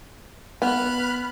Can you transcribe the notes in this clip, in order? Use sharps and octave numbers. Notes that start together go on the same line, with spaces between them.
B3 B5 F6 F#6